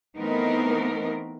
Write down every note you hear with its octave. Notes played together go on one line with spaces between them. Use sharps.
E3 A3 B3 C4 D#4 A#4